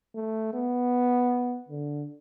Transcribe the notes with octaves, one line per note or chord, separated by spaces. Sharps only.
A3
B3
D3